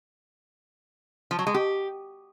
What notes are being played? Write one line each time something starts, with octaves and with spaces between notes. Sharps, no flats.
F3
F#3
G#3
G4